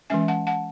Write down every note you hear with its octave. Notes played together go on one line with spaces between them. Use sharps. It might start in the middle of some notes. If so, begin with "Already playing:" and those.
E3 G#3 C#4 E5 G#5
F#5 A5
F#5 A5